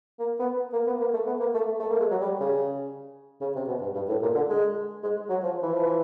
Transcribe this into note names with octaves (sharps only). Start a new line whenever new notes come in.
A#3
B3
A#3
B3
A#3
A3
B3
A#3
A3
A3
A#3
G#3
F#3
G3
C#3
C#3
C3
B2
G2
G2
A2
A#2
D3
G#3
G#3
F#3
F3
E3
F3
E3